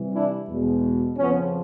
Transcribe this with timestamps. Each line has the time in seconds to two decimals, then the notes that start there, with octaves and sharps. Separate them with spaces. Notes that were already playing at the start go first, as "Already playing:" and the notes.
Already playing: C3 E3 G3
0.14 D4 E4
0.49 E2 B2 G#3
1.18 F2 C#3 F3 B3 C#4